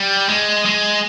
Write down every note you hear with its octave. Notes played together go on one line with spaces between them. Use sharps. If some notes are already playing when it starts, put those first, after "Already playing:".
Already playing: G3
G#3
G#3